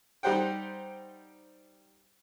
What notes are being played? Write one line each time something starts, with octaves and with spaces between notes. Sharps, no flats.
G3 D#4 G4 C5 F#5 G5